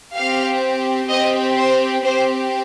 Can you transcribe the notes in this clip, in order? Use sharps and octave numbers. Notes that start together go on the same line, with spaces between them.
C4 G4 F5
C4 G4 D#5
C5
C4 G4 C5